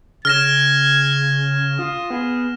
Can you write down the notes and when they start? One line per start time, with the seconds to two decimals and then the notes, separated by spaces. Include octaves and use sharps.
0.25 C#3 F6 G#6 A#6 E7
1.79 F4 D#6
2.10 B3 G#4